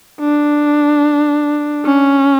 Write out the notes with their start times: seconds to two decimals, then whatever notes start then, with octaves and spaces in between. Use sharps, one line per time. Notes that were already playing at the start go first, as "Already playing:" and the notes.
0.20 D4
1.86 C#4